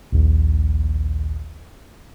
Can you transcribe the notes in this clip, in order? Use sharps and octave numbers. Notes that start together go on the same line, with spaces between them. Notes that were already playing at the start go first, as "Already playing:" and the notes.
A#1 D#2